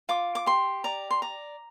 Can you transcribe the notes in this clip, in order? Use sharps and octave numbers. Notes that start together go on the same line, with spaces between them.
F4 D6
D6
G4 C6
D5 A#5
C6
D5 A#5